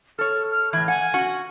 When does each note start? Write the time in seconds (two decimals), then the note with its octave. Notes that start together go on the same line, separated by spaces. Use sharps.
0.19 A4 C#5 F6
0.51 F6
0.73 A2 E3 G#6
0.88 F#5 G#5
1.14 C#4 F#4 F#5